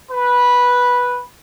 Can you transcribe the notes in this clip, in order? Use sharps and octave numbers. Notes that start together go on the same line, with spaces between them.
B4